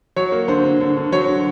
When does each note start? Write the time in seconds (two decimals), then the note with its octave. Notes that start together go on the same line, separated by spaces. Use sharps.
0.16 F#3 C#5
0.32 A#3
0.48 D3 C5
0.64 D3
0.80 D3
0.96 D3
1.12 F#3 C#5
1.28 D3